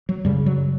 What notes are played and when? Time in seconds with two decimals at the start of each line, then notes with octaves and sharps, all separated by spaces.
0.09 F#3
0.25 F#2 C#3 G3
0.46 F#3